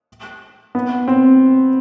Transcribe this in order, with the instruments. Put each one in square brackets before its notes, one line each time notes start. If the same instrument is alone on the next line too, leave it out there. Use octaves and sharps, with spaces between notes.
[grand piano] B3
C4